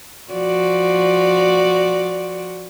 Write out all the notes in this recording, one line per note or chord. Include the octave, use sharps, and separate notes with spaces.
F3 F#4 D5